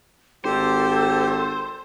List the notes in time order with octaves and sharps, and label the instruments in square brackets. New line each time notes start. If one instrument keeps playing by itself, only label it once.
[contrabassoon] G#1 [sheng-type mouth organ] G4 [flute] A4 [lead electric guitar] C5